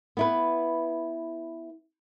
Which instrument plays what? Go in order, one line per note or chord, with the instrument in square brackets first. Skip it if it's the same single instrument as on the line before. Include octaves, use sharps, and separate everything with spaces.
[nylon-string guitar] B3 E4 B4